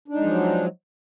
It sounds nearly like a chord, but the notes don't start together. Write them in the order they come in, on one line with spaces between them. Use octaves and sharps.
D4 D#4 G#3 F3 F#3